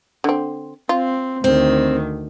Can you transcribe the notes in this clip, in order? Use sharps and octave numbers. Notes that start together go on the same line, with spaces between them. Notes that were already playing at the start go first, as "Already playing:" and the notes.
D3 C4
C4 F4
D2 D#3 C4